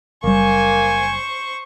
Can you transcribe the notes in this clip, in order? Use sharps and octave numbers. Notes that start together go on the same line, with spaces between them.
F#1 G3 A#3 C5 G#5 C#6